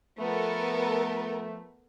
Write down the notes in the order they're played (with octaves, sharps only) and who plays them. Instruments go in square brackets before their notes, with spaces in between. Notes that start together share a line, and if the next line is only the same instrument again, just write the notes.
[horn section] F3 A3 [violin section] B3 A4 A#4